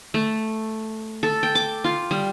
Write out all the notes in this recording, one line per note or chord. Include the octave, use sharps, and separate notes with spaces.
A3
A4
G5
D6
F4
G3